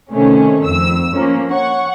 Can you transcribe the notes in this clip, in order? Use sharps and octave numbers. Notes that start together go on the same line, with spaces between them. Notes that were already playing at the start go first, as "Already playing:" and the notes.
C3 D#3 A3 C#4
F2 E6
F3 A#3 C#4
C#5 F#5 C#6